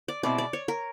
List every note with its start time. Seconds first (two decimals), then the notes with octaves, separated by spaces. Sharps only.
0.08 D5
0.23 B2 G#3 C4 E4 D5
0.38 D5
0.53 C#5
0.68 A#4